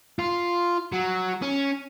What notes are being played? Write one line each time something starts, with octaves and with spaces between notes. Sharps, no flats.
F4
F#3
C#4